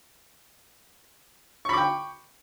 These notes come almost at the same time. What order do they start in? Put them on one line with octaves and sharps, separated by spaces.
C#6 B5 D6 G5